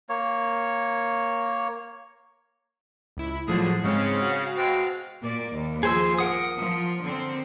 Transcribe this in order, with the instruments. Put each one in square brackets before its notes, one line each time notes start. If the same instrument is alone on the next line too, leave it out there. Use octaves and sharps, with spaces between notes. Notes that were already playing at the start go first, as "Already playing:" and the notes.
[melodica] A#3 C#5
[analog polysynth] C#2 E4
[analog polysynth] A2 F3 F#3 [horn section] D3 G#4
[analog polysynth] G#2 G#3 C4 [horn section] C#3
[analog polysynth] F#4 F5
[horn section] B2 G#3 C4
[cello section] A#2 A#3 D5
D#2
[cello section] F3 [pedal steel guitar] G#4 C5 E6
[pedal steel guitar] A#4 F#5 D#6
[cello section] F3
D3 C4